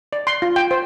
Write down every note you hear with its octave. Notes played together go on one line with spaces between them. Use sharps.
D5
C6
F4
G5
C5